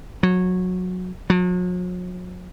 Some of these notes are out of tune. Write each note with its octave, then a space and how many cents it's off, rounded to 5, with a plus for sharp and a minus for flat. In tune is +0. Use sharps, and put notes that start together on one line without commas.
F#3 -20
F#3 -45